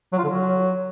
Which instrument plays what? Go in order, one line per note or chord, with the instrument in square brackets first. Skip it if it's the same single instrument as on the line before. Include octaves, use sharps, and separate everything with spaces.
[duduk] F#3
F4
D3
F#3